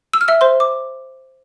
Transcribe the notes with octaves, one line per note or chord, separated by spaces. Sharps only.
E6
F6
E5 E6
C5 C6
D6